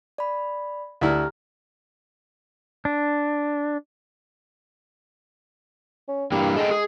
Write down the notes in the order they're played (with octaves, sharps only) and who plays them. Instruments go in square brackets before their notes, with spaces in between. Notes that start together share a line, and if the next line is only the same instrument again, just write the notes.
[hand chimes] D5 B5
[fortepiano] D2 E4 [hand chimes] G4 A#5 F6
[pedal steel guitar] D4
[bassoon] C#4
[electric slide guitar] G2 E3 A#3 [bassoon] G4
[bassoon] G#3 [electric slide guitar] A4 D#5 G5
[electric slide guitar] G#4